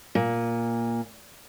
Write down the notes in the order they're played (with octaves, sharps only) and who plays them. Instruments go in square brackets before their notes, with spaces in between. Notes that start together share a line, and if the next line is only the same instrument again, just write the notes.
[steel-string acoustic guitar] A#2